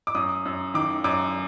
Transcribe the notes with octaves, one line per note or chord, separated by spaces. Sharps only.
D6
F#2 D#6
F#2
D#3 D6
F#2 D6